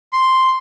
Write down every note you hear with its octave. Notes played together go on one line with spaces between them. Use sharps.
C6